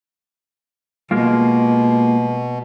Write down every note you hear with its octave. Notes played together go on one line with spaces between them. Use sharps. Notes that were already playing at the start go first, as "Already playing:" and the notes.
B2 G#3 A#3 F4